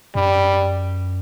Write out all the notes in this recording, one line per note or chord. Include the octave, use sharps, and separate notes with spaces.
F#2 G3